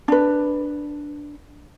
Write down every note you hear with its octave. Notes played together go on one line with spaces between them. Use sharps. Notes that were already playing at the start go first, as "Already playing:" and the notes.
D4 B4